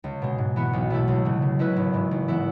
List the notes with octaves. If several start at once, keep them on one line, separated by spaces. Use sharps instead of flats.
C#2
B2 G#3
G#2
E3 B3 F#4
B1
B2 A3 E4 A4
C#2
C#3 F#3
C#3
G#3 C#4 E4 B4
G#1
G#2 E3
G#1
E3 B3 E4